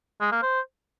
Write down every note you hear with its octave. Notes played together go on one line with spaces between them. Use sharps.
G#3
A#3
C5